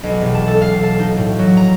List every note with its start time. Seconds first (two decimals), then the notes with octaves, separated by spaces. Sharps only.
0.03 B1
0.21 E1
0.34 A5
0.48 A4
0.62 F5
0.83 A5
1.00 D#4
1.17 A2
1.39 F#3
1.57 A#5